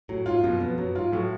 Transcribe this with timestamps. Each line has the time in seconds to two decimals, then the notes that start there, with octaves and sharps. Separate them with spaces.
0.09 A2 F#3
0.26 G#2 F4
0.43 F#2 B2
0.60 F2 B3
0.78 F#2 F#3
0.95 G#2 F4
1.12 A2 F#3